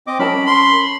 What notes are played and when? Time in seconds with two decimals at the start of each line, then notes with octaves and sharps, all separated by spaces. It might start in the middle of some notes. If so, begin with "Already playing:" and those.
0.07 C4 D#5 D6
0.19 C#4 A#4 A5 B5
0.46 C6